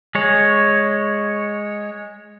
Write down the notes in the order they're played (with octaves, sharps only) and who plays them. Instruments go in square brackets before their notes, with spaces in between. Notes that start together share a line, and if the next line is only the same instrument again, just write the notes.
[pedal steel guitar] G#3 C#5